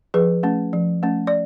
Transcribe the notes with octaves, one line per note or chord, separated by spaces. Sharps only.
F3 G#4 B4
A3 C#4
F3
A3 C#4
D5